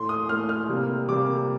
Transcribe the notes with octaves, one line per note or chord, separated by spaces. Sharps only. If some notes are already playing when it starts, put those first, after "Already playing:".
Already playing: A2 A3 C6
D#6
A2 A3 F6
F6
C3 G3 A#3
C3 G3 A#3 D6